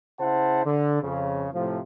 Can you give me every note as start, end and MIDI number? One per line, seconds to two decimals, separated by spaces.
0.20 0.62 49
0.20 0.62 64
0.20 0.62 72
0.20 0.62 78
0.20 0.62 81
0.65 1.01 50
1.02 1.48 41
1.02 1.48 49
1.53 1.79 45
1.53 1.79 48
1.53 1.79 53